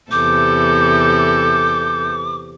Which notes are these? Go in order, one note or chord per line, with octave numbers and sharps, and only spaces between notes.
E2 C3 A4 D6 G6